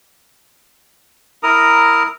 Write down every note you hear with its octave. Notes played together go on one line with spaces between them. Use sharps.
E4 A#4 A#5 D#6